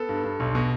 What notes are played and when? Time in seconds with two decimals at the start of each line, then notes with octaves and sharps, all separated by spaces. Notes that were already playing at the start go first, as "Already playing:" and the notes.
Already playing: B3 A4
0.09 G2
0.24 G2
0.40 B1
0.55 B2